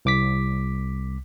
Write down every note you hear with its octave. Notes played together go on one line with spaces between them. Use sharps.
C2 D6 B6